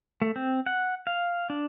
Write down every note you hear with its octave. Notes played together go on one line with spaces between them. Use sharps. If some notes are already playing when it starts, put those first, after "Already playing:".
A3
C4
F#5
F5
D4